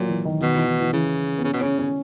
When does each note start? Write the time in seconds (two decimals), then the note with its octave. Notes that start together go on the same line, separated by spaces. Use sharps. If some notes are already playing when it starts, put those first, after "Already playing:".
Already playing: A#2 F#3
0.08 E3
0.25 D#3
0.41 B2 D#3
0.55 E3
0.67 D#3
0.80 E3
0.93 C#3 E3
1.38 B3
1.44 C#3 C#4
1.53 B2
1.61 C#3 C#4
1.79 C#4